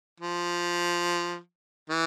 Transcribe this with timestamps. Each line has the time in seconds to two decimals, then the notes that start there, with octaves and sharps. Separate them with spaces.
0.20 F3
1.90 E3